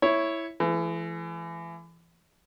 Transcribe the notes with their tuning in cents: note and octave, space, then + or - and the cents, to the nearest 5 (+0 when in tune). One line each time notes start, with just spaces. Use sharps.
E4 +0 C#5 +0
E3 +30 A3 -40